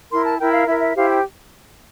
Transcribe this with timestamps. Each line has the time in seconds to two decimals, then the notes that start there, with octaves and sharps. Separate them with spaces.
0.11 E4 A#4 C6
0.26 A5
0.39 E4 A#4 G5
0.53 F5
0.67 E4 A#4 E5
0.81 E5
0.95 E4 G4 C5 F5
1.09 G5